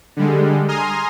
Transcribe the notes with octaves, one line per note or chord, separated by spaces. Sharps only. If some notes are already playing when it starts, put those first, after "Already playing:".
D3 G3 G#3
G#5 A#5 C6 D#6 F6